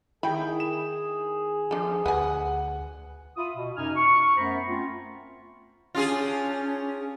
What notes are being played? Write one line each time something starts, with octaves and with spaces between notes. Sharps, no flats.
D#3 E4 G#4 G5 B5
E7
F3 D4 A4
D2 B4 F#5 G#5
F4 E5 B5 D#6
B2
F#2 C3 D#4 G#5 F6
C#6
F#2 A3 B3 C5 A#5 B5
A3 C4 C#4 F4
C#4 D4 F4 G4 G#4